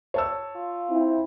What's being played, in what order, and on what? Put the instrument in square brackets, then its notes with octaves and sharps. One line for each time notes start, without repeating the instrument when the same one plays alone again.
[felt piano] C#5 A5 E6
[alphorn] F4
[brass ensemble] C4 E4